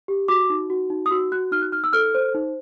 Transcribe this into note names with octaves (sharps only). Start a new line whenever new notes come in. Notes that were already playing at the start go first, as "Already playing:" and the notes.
G4
F#4 D6
D#4
F#4
D#4
D#6
F#4 E6
F#4 F#6
D#4 F6
F#6
D#4 F6
E6
A4 F6
C5
D#4